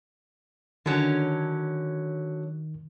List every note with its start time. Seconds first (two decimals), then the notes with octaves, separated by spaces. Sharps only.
0.86 D3 D#3 F#3 C#4